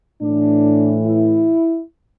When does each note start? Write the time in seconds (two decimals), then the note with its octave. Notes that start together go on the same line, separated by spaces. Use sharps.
0.21 A2 E3 D4
1.06 E4